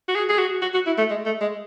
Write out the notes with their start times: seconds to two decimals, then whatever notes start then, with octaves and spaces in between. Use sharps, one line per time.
0.09 F#4
0.15 G#4
0.29 G#4
0.39 F#4
0.62 F#4
0.74 F#4
0.87 E4
0.98 A3
1.10 G#3
1.26 A3
1.41 G#3